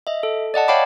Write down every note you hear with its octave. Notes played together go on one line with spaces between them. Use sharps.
D#5 E5
A4
D5 D#5 F#5 A5
C#5 F5 G5 A5 B5 D6